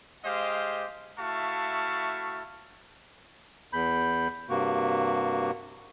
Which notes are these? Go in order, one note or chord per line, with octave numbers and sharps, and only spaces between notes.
G#3 G4 C5 D#5 F5
A3 E4 F#4 F5 A5 C#6
E2 B5 G6
G2 C3 A#3 F#4